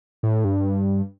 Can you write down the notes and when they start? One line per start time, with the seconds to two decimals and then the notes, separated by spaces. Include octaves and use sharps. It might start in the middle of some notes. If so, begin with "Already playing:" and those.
0.23 A2
0.45 G2